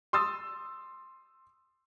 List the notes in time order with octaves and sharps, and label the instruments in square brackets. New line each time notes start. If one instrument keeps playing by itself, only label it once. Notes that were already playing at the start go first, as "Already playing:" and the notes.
[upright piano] C6 D#6 E6 A6